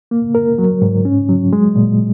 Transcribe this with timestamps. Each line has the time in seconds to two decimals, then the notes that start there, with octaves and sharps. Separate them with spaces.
0.11 A#3
0.35 A#4
0.58 F#3
0.82 G#2
1.05 C#4
1.29 F#3
1.53 G#3
1.76 A#2